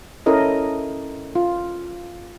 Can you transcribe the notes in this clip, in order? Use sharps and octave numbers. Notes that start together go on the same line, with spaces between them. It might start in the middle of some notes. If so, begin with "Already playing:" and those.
C#4 E4 A4 A#4 D#5
F4